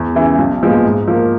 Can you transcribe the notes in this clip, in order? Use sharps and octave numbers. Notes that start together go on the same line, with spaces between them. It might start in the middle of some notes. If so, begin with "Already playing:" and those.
Already playing: E2
C#3 E3
B1
A#2 F3 G#3 B3
G#2
F3 A#3